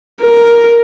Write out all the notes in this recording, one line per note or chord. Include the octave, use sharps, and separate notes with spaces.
A#4